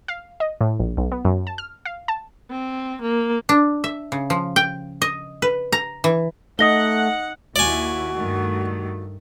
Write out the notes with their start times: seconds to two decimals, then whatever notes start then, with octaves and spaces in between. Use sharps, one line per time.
0.08 F5
0.40 D#5
0.61 A2
0.80 A#1
0.97 B1
1.12 B3
1.25 F#2
1.47 A5
1.58 F6
1.85 F5
2.08 A5
2.51 C4
3.02 A#3
3.49 D4
3.84 E5
4.12 C#3
4.30 F3
4.56 G5
5.02 D#5
5.42 B4
5.72 A#5
6.04 E3
6.59 A3 D#4 D#5 F#5 D#6 A#6 G7
7.56 D#2 E4 F#4 D5 G#5
8.16 G2 D#3 A3